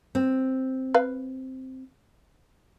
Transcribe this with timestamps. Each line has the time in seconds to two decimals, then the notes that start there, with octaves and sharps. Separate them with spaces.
0.15 C4
0.94 B4 F5